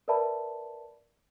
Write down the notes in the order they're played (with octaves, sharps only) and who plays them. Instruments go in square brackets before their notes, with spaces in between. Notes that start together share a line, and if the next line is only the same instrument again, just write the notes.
[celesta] A#4 B4 D5 E5 A5 B5